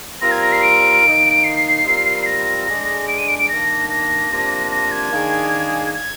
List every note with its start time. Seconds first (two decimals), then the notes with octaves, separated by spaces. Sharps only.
0.21 G3 C4 F4 A#4 A#6
0.32 G#6
0.42 A#6
0.52 C7
0.62 D7
1.03 D#3 A#3 D#4
1.44 C7
1.84 G3 C4 F4 A#4
2.26 A#6
2.67 D3 G#3 D4 G#4
3.08 D7
3.18 D#7
3.28 D7
3.39 D7
3.48 D#3 A#3 D4 A#6
3.90 A#6
4.30 C3 F3 A#3 D4
4.72 A#6
4.92 G#6
5.12 D#3 A#3 D4 G#4
5.94 G#6